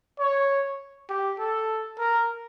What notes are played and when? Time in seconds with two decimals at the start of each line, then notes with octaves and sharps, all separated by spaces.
0.19 C#5
1.09 G4
1.39 A4
1.99 A#4